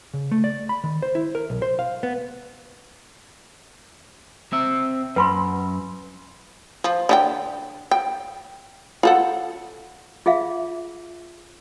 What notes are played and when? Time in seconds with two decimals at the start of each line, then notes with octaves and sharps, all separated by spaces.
0.14 C#3
0.32 A3
0.44 D5
0.69 B5
0.84 D#3
1.02 C5
1.15 E4
1.35 A#4
1.50 B1
1.62 C5
1.79 F5
2.03 B3
4.53 C4 E5
5.16 F#2 B4 B5 C6
6.84 F3
7.09 D3 C#4 G5
7.91 G5
9.03 F4 A4 F#5
10.26 F4 G#4 E5 F5